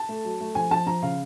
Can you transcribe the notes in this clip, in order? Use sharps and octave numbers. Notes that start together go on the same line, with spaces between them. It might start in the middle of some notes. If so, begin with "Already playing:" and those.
Already playing: A5
A3
F#3
A3
F3 G#5
F3 A5
F3 A#5
C#3 F5